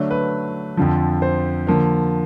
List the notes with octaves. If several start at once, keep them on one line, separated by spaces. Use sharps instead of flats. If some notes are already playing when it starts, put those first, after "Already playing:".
Already playing: D3 F#3 A3 D4
B4
F2 D3 F3
C5
D3 F3 A#3